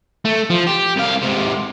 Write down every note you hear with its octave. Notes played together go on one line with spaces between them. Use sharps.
A3
F3
G4
C2 F5
G#2 C3